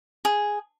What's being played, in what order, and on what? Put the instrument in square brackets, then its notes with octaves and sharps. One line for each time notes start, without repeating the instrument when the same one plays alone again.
[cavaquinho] G#4